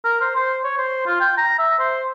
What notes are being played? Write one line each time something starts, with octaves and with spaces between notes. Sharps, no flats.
A#4
C5
C5
C#5
C5
F4
G5
A#5
E5
C5